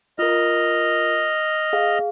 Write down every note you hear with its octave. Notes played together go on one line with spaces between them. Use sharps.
F4 A#4 D#5 F6
G#4 F5